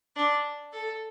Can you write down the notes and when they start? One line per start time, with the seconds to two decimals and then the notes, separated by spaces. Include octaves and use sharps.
0.16 D4
0.72 A4